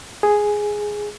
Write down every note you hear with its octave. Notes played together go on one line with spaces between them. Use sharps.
G#4